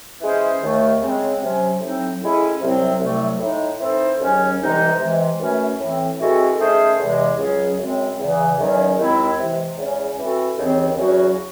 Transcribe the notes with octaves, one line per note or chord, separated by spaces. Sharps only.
E3 G#3 C#4 G#4 C5
D#2 D#3 A3
C#3 G#3 C4
C3 F#3 C#4
A2 F#3 C4 D#4
A2 G#3 C#4 E4
C2 C3 F#3 C4
C2 C3 F#3 A3
A2 G#3 D#4
E3 C4 D#4 A4 C5
D#2 C#3 F#3 C#4
C2 C3 E3 G#3 D#4
C3 E3 G#3
F#2 E3 A3 C#4
A2 E3 C4
E3 G#3 C4 F#4 A4
D#3 A3 C#4 G#4 C5
E2 C3 E3 G#3
C#2 C#3 F#3 C#4 G#4
F#2 C#3 G#3 C4
E2 C#3 E3
E2 D#3 F#3 C#4
D#2 D#3 G#3 C4 E4
C3 E3 G#3
E2 C#3 G#3 C#4
E3 C4 F#4 A4
D#2 C#3 E3 C4
E2 C#3 F#3 C#4 F#4